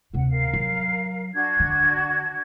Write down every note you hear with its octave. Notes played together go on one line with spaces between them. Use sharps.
D2 C3 F#5
A#4 F5
F#3
D4 F#4 G#6
D3